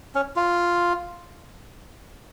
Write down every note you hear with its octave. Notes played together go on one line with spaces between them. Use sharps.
C#4
F4